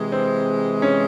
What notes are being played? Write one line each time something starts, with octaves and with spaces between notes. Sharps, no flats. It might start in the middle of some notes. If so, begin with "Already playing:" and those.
Already playing: C3 E3 G#3
C4
C#4